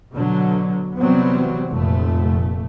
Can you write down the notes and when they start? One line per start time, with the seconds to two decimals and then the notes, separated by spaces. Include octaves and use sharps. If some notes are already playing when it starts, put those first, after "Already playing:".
0.14 B2 D3 F#3
0.97 C3 E3 F#3 G3 B3 C4
1.70 F1 A#2 A3